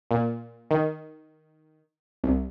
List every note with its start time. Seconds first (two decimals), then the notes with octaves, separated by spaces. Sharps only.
0.11 A#2
0.71 D#3
2.24 C2